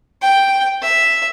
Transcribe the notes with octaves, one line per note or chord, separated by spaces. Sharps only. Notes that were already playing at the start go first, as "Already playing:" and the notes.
G5
E5